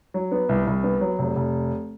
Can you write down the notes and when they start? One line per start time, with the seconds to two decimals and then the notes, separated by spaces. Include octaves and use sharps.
0.14 F#3
0.32 B3
0.49 C2
0.67 C2
0.84 B3
1.01 F#3
1.19 F1
1.36 F1